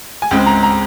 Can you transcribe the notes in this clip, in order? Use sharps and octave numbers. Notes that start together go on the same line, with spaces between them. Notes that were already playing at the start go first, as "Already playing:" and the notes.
G#5
C#2 C#3 G#3 C4 G5
A#5
A#5